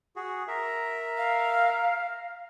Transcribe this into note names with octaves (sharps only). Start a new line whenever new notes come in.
F#4 G#4
A#4 E5
F5